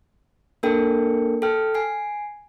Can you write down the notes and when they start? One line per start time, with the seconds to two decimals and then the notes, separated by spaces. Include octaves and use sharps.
0.63 A#3 D4 A4 A#4 G5
1.42 A4 G5 F6
1.75 G#5 C7